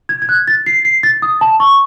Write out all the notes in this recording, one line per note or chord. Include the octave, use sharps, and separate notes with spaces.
G#6
G#6
F#6
A6
C7
C7
A6
D#6
A5
C#6